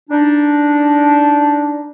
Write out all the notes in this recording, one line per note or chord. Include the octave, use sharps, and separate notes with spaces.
D4 D#4